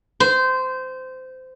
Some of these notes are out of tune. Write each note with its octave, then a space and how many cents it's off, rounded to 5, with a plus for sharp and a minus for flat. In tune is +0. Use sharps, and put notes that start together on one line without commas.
C5 -20